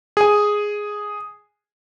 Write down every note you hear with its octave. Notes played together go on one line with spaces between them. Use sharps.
G#4 G#5